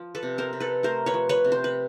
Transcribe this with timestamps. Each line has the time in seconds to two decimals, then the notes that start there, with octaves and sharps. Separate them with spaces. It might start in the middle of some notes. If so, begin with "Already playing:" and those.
Already playing: F3
0.15 A4 B4
0.23 C3
0.38 A#4 C5
0.53 C3
0.60 A4 B4
0.83 A3 A#4 C5
1.06 B4 C#5
1.14 F3
1.29 B4 C#5
1.44 C3
1.52 C5
1.64 B4